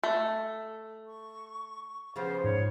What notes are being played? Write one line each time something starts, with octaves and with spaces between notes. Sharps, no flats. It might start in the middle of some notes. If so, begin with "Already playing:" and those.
A3
C#6
C#3 F3 B3 C5
G#2 C#5